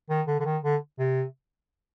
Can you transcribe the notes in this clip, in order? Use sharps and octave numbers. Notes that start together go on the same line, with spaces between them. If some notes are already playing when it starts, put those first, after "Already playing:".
D#3
D3
D3
D#3
D3
C3